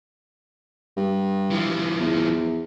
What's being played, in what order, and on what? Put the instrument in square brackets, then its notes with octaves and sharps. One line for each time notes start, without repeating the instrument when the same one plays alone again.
[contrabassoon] G2
[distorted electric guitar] E3 F3
[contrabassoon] E2